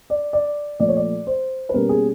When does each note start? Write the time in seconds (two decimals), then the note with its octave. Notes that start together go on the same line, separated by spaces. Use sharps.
0.10 D5
0.33 D5
0.80 A#2 F3 A3 D5
0.88 C#5
0.97 D5
1.27 C5
1.69 B4
1.73 B2 G3 A#3 C#4 A#4
1.89 G#4